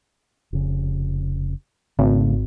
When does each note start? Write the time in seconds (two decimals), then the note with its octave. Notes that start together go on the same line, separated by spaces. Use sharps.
0.53 F1 C#3
1.99 G#1 C#3 A3